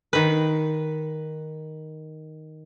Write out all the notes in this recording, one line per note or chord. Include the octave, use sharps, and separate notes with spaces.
D#3 B4